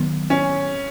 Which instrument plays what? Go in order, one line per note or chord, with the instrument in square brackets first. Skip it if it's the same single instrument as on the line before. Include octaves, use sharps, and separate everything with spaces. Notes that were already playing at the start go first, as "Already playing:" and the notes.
Already playing: [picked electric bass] D#3 F#3 B3
[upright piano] C#4